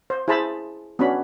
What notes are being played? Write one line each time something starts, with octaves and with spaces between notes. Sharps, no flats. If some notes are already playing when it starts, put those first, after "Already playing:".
C5
E4 G#4 C5 A5 B5
B3 C#4 D4 F#4 B5